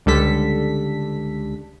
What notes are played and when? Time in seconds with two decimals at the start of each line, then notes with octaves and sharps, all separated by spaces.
0.06 C#2 D3 G3 A4 B6